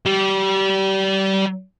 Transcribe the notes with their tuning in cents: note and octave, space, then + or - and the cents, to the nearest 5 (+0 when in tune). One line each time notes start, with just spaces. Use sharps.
G3 -25